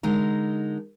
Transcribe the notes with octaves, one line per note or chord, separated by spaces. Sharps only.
D3 G#3 D#4 A#4